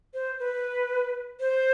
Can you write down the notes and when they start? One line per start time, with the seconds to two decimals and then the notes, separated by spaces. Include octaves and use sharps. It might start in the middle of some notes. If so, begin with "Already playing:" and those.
0.14 C5
0.39 B4
1.40 C5